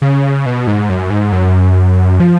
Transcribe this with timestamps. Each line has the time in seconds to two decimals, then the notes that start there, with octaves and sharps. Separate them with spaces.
0.02 C#3
0.46 B2
0.67 G#2
0.90 F#2
1.10 G#2
1.32 F#2
2.20 F3